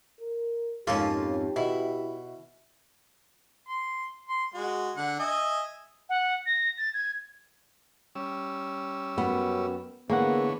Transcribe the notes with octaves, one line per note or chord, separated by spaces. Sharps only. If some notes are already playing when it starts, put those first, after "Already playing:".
A#4
F2 G#2 A#3 C#4 F4 G4 A4
B2 E4
C6
C6
G#3 F#4
D3 F#5
D#5 E5 G#5
F#5
A#6
A6
G#6
G3 C#4 E6
F#2 B3
D3 E3 A#3 B3 G#4 C#5 F#5